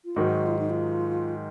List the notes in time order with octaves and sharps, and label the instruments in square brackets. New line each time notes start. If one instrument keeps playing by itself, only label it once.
[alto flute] F4
[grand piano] G#2 D#3 F#3 [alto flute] F#4
[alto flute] F4
D#4
F4